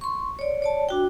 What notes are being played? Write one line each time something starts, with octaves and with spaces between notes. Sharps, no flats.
C6 C#6
C#5 D5
C#5 D5 A5
D4 F#4 G5